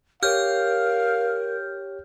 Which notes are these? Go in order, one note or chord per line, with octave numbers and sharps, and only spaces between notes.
G4 A#4 C#5 F5 F6 G6